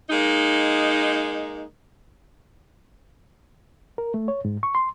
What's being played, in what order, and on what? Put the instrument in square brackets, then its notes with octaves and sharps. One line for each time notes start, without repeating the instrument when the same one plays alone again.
[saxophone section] G#3 A#3 D#4
[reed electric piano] A#4
A3
C#5
G#2
C#6
C6